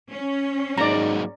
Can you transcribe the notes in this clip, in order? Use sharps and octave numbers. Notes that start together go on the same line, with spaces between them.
C#4
G#2 F#3 A#3 D#4 D5 A#5